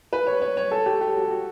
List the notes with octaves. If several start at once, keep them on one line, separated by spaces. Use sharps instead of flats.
B4
C#5
C#5
C#5
A4
G4
G4
F#4
F#4